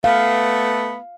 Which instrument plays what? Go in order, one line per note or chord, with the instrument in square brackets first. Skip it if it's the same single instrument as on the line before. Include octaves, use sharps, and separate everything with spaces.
[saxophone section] A3 B3 [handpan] F5